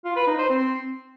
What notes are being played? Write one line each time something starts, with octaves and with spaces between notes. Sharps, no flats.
F4
B4
D#4
C5
C4